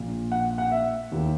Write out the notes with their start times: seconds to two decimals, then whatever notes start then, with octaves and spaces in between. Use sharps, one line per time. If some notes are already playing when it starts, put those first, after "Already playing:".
Already playing: A#1 A#2
0.32 F#5
0.58 F#5
0.71 E5
1.12 D#2 D#3